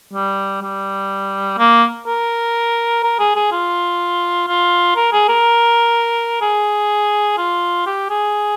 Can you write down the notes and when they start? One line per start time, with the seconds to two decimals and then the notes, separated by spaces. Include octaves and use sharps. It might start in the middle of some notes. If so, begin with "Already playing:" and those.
0.13 G3
0.62 G3
1.58 A#3
2.07 A#4
3.03 A#4
3.19 G#4
3.35 G#4
3.52 F4
4.48 F4
4.96 A#4
5.13 G#4
5.28 A#4
6.41 G#4
7.38 F4
7.87 G4
8.10 G#4